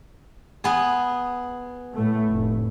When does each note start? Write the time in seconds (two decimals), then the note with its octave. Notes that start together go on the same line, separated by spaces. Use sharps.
0.64 B3 G#4
1.95 A2 A3
2.32 F1